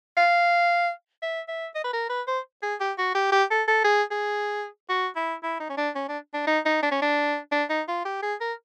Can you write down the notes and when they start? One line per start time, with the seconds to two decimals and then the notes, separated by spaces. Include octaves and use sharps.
0.17 F5
1.23 E5
1.48 E5
1.75 D#5
1.84 B4
1.93 A#4
2.10 B4
2.28 C5
2.63 G#4
2.81 G4
2.98 F#4
3.15 G4
3.32 G4
3.51 A4
3.68 A4
3.85 G#4
4.11 G#4
4.90 F#4
5.16 E4
5.43 E4
5.60 D#4
5.70 C#4
5.78 D4
5.96 C#4
6.09 D4
6.34 D4
6.47 D#4
6.66 D#4
6.83 D4
6.92 C#4
7.02 D4
7.52 D4
7.70 D#4
7.88 F4
8.05 G4
8.23 G#4
8.41 A#4